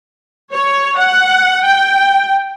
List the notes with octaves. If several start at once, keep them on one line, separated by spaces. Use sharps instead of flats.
C#5
F#5
G5